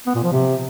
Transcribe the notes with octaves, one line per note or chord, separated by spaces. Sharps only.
B3
A#2
F3
C3